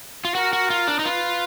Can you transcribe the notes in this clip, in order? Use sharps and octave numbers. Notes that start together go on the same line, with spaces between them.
F4
F#4 A#4
F#4
F4
D4
D#4
F4 B4